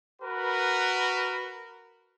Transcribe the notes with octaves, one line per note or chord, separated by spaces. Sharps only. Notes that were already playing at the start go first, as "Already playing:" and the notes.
F#4 A#4 B4